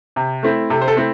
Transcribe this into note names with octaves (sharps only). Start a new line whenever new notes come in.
C3
A3 C4 E4
C3 A4
C5
A4
A3 C4 E4